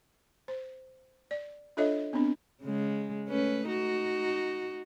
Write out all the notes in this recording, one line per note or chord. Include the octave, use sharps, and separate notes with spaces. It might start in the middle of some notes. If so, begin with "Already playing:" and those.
C5
D5
D4 F4 A4 C#5 D#5 E5
B3 C4 D4
C#3 G#3
A3 C#4 B4
D#4 F#4